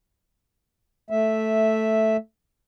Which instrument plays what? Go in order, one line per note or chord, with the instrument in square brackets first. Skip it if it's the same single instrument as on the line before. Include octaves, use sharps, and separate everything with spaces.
[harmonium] A3 E5